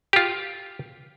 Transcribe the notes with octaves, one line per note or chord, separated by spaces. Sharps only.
F4 G4